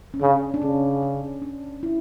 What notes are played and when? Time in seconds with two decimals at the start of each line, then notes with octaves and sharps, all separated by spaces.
0.14 C#4
0.21 C#3 D4
0.54 D4
0.62 C#3 C#4
1.03 D4
1.42 D4
1.83 E4